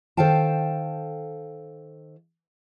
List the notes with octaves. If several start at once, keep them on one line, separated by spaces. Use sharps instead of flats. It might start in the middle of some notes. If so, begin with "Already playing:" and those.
D#3 A4 C5 F5 G5 A5